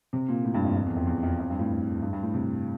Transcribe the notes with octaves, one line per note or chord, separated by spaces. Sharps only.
C3
A#2
A2
G2
F2
F2
E2
F2
E2
F2
F2
G2
A2
G2
G2
A2
C3